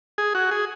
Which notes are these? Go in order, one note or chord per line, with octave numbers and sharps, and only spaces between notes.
G#4
F#4
G#4